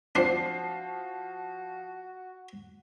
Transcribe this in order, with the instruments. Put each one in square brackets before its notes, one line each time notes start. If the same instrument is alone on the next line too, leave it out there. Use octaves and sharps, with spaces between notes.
[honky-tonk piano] F3 C7 [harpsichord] C4 D4 [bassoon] F#4